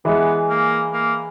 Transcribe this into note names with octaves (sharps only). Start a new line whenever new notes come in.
E3 G#3 B3
A#3
A#3